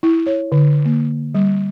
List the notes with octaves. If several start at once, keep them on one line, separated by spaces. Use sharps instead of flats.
E4
C#5
D3
A#3
G3